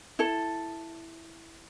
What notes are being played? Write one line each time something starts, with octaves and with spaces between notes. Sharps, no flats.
E4 A4